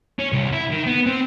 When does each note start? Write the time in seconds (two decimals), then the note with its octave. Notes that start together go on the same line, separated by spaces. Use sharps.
0.19 C#4
0.33 C2
0.52 E4
0.71 D#3
0.87 B3
1.06 C4